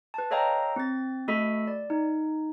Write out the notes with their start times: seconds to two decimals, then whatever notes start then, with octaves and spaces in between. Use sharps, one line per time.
0.14 B4 A5
0.31 A4 C#5 D#5 F5 G5 A#5
0.76 C4 A6
1.28 A3 F#4 A4 D#5 B5 B6
1.67 D5
1.90 D#4